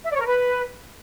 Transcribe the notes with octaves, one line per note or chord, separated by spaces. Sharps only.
E5
D5
C#5
A#4
B4